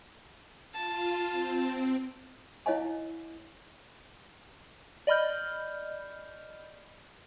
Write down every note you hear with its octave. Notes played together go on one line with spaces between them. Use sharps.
F4 A5
C4
E4 C#5 D#5 F5 G#5
D5 D#5 B5 F6 G6